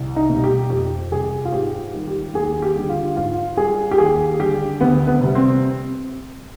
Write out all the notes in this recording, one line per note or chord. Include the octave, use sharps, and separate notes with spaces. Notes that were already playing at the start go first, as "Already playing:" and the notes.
Already playing: C2
D#4
B2
G3
G4
F2 G4
C3 G3 G#4
F4
G#2 G4
D#3 G3
G4
D#2 G#4
G4
D3 G3
F4
G#2 F4
G3 G#4
G4
D#2 G#4
D3 G3 G4
D2 B3
B3
C3 G3
C4